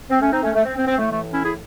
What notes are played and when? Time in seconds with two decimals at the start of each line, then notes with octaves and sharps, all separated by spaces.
0.09 C4
0.20 A3 C#4
0.31 C4 D#4
0.42 A3 C#4
0.54 A3
0.64 C4
0.75 C4
0.86 C4
0.98 A2 E3 A3
1.10 A3
1.31 C#4 E4
1.42 E4 G#4